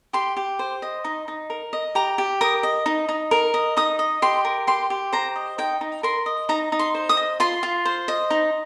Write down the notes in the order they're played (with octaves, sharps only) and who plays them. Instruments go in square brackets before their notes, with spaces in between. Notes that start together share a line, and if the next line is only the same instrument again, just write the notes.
[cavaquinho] G4 C6
G4
C5
D#5
D#4
D#4
A#4
D#5
G4 A#5
G4
A#4 D#6
D#5
D#4
D#4
A#4
D#5
D#4 D#6
D#5
G4 C6
A#4
G4 C6
G4
C5 A#5
D#5
D#4 G5
D#4
A#4 C6
D#5
D#4 A#5
D#4
C6
C5
D#6
D#5
F4 C6
F4
C5
D#5
D#4